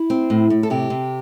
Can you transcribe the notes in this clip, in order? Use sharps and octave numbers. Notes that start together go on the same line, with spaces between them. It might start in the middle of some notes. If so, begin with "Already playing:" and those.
Already playing: E4
C4
A2
A2
A4
C3 G4
C3